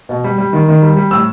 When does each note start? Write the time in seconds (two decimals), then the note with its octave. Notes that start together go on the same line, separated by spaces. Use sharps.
0.09 B2
0.24 G3
0.38 G3
0.53 D#3
0.68 D#3
0.82 G3
0.96 G3
1.11 A2 E6